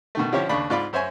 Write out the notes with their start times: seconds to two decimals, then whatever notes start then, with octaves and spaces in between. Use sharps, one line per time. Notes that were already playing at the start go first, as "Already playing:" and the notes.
0.15 B2 D#3 A3
0.32 D3 F3 C#4 E4 G4 C#5
0.49 D#2 C#3 D4 B5
0.70 G#2 F4 D5 B5
0.93 F#2 C5 C#5 E5 G#5